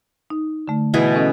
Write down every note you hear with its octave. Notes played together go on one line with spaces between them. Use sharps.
D#4
D3 A3
B2 E3 G#4
C#4 A4 D#5